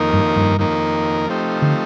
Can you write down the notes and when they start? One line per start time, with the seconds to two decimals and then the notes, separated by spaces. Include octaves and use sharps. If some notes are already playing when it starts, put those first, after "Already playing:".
Already playing: F2 D#3 A#3 D#4 A#4
0.13 G2
0.36 G2
0.59 F2 D#3 A#3 D#4 A#4
1.28 F3 A3 C4 D#4 G4
1.62 D3